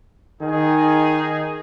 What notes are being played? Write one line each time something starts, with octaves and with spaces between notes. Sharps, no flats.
D#3 D#4 G#4